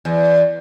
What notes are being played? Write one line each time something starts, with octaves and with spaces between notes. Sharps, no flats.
E2